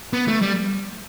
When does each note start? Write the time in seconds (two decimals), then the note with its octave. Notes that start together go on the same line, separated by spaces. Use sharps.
0.13 B3
0.28 A3
0.42 G3